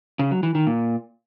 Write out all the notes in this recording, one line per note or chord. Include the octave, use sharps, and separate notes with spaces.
C#3
F#3
E3
D#3
A#2